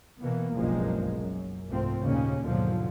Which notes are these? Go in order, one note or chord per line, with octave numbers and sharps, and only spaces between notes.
B2 E3 A#3 B3
F#1 B1 G2 F3 G#3 A#3
F#2
C2 G#2 F3 A3 C4
D#2 A#2 C#3 A#3 C#4
D#2 G#2 B2 D3 F3 F#3